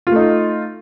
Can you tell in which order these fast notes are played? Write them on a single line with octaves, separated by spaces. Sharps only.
F4 A3 D#4